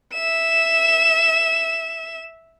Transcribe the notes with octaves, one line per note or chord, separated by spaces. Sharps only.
E5 E7